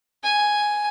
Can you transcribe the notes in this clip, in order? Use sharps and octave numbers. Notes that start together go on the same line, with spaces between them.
G#5